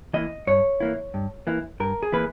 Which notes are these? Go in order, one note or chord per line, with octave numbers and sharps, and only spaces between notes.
E3 A#3 E4 D#5
G2 C#5
E3 A#3 E4
G2
E3 A#3 E4
G2 A#4
G#4
E3 A#3 E4 B4